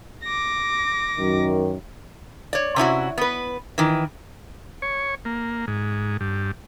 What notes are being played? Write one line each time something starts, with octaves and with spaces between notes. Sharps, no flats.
D6 A#6
F#2 D#3
C#5 D5
C3 C#4 E4 F#4
B3 B4
D#3 E3
C#5
A#3
G#2
G2